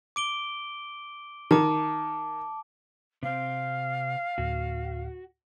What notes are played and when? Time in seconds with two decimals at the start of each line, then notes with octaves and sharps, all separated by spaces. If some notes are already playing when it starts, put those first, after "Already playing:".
0.16 D6 D7 G7
1.51 D#3 A5 D6
3.23 C3 C4 F5
4.38 D2 A2 F#4